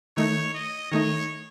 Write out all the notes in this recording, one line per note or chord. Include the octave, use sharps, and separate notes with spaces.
D#3 A3 D#4 C#5
D#5
D#3 A3 D#4 C#5